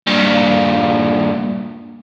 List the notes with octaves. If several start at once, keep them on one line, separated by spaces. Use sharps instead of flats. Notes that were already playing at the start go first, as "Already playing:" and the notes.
G2 A#2